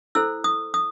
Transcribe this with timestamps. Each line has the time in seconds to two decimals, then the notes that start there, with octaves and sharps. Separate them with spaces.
0.15 E4 A4 C5 E6
0.44 D#6
0.74 D#6